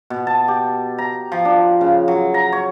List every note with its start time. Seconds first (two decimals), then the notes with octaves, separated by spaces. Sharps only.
0.10 B2
0.27 A5
0.48 G4
0.98 A#5
1.32 F3
1.45 D4
1.81 C#3
2.08 F#3
2.34 A#5
2.52 C#5